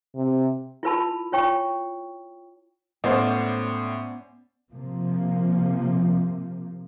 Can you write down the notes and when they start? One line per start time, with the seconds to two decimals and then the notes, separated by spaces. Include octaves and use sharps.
0.15 C3
0.83 E4 F4 B4 A5 B5
1.32 F4 C#5 G5 C#6
3.04 A2 B3 C#4 C5 D5 C6
4.71 C3 F3 A#3